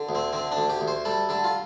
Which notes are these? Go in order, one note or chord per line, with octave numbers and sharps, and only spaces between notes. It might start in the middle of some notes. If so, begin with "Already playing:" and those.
Already playing: D3
D2
C4
D3 C4
D4
D2
G4
D2
C5
G3 A4
D3 A4
F4